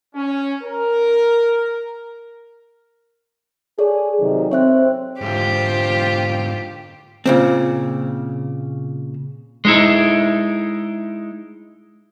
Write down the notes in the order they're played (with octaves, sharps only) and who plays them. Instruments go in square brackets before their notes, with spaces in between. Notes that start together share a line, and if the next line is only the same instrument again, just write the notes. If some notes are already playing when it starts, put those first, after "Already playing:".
[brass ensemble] C#4
A#4
[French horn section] G#4 [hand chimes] A4 C#5 D5
[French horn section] C3 D#3 F#3
[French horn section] C4 [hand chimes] C#5 E5 F#6
[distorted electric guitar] G#2 D3 [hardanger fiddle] F4 C5 [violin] G4
[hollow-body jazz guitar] A#2 C#3 C4
[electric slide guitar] G#3 D#4 E4